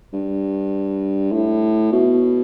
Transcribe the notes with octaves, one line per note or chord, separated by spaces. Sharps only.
G2
A2
B2